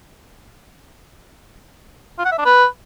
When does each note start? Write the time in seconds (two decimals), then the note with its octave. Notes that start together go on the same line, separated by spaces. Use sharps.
2.18 F4
2.25 F#5
2.32 E5
2.38 D4
2.45 B4